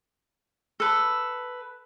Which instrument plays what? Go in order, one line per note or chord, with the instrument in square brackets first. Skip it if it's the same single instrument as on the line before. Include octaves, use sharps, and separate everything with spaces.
[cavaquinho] A4 B4